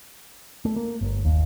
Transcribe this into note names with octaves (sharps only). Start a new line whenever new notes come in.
A3
A#3
G1
D#2